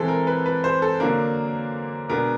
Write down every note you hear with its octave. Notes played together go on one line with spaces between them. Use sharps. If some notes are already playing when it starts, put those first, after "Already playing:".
Already playing: E3 G#3 C4 A4
A#4
B4
B4
C5
A4
D3 F#3 A#3 D4 A#4
B2 G#3 B3 D4 A#4